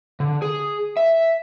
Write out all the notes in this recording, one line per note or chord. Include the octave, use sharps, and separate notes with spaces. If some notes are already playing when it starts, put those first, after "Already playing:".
D3
G#4
E5